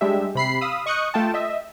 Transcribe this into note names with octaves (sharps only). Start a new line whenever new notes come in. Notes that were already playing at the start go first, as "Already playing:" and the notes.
G3 G#3 D4 G4 E5
C3 B5 C7
F5 B5 D#6 E6
D#5 C#6 D#6 F#6 G6 C#7
A3 F4 G5 A5
D#5 E5